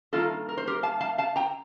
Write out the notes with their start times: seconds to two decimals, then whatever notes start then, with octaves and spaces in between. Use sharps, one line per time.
0.13 G2 D#3 A#3 F4 A4
0.49 A#4
0.57 C5
0.67 G4 A#4
0.83 F5 A5
1.01 F5 A5
1.18 F5 A5
1.36 G5 A#5